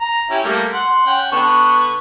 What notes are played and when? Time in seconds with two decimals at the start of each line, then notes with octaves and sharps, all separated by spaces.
0.01 A#5
0.30 C#4 E4 G4
0.44 G3 A3 A#3
0.74 F#5 C6
1.07 C#4 F#5 G5
1.32 D3 B3 C#6